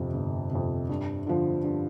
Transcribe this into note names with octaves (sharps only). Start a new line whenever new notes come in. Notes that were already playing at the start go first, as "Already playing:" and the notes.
Already playing: G1 F2 C3
G1
F2 C3
G2
D3 F3
G2